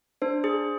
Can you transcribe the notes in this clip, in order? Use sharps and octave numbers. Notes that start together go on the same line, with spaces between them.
D4 C5
G#4